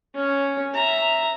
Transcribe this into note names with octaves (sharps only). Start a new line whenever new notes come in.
C#4
E5 A#5